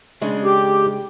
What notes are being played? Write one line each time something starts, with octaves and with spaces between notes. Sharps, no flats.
C#3 G#3 D4
G4